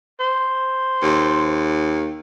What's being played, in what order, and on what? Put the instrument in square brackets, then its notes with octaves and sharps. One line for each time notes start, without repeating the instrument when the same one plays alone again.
[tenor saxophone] C5
[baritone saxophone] D#2